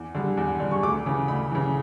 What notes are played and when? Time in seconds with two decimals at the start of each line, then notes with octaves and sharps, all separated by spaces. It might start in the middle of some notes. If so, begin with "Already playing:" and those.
Already playing: E2
0.15 D3 G3
0.37 E2
0.60 D3 G3
0.71 C#6
0.83 D2 D6
1.06 C#3 E3
1.28 D2 B5
1.52 C#3 E3